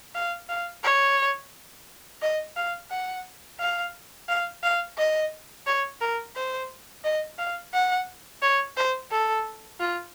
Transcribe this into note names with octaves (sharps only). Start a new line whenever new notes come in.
F5
F5
C#5
D#5
F5
F#5
F5
F5
F5
D#5
C#5
A#4
C5
D#5
F5
F#5
C#5
C5
A4
F4